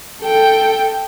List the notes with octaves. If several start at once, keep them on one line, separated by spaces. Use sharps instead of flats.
A4 G5